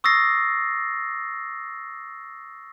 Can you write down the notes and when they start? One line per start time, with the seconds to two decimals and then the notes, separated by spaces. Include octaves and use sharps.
0.04 C#6 D#6 E6 A6 A#6 C7